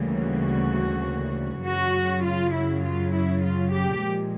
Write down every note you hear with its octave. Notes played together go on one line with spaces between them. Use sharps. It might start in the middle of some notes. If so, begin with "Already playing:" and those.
Already playing: D2 C#3 E3 G3 A#3
F#4
F#2 C#3 F#3 F#4
F4
E4
F4
E4
F4
G4
A#2 F3 G#3